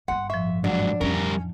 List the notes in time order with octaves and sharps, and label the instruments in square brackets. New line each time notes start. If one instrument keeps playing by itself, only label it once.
[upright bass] G1 G2 [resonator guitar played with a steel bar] F#5 [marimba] C6
[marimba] A2 F3 [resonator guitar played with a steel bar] E5
[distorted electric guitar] G#2 F#3 [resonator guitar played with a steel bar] D4 [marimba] F#5
[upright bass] F2 E3 [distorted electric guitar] G3 A#4 [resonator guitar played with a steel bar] C#4